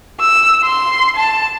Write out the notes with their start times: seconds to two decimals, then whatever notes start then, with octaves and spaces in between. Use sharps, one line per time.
0.20 E6
0.64 C6
1.16 A5